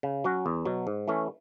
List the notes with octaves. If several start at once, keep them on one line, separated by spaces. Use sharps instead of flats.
C#3
F#3 C#4 F#4
E2
B2 F#3
G#2
E3 A3 C#4